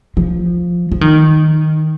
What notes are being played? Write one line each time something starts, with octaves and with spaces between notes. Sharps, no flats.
F3
F3
D#3